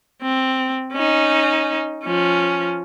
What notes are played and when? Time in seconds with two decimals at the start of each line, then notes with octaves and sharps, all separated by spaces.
0.23 C4
0.93 C#4 D#4
2.04 F3 C#4